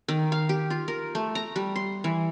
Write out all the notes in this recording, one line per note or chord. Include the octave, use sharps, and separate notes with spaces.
D#3
F5
G4
F4
A#4
A3
A#5
G3
C6
E3